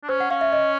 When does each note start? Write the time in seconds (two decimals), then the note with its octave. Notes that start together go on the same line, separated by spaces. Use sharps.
0.03 D4
0.09 C#4 C5
0.20 F#5
0.30 C#4 F5
0.41 E5
0.53 D#5